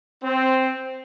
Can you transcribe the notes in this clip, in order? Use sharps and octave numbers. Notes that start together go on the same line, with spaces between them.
C4